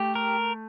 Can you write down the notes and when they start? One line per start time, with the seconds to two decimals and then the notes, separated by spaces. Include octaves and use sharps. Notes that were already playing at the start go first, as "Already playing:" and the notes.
Already playing: A3 G4
0.15 A#4